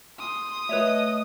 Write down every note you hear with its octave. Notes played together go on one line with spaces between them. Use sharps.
C6 D#6
A3 B4 C#5 D#5 E5